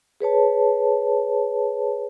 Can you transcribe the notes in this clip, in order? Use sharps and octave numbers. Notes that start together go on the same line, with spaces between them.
G#4 B4 C#5 A5